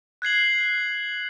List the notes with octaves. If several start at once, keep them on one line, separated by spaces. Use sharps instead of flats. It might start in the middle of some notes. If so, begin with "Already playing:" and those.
F#6 G#6 C7 F#7